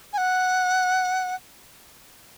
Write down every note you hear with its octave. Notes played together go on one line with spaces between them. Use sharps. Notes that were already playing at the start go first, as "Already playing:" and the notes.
G#5
F#5